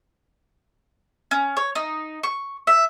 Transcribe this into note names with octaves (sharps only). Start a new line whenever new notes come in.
C#4
C#5
D#4
C#6
E5